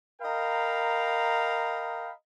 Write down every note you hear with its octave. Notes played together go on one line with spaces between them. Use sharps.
A#4 D#5 F5 G5 A#5 B5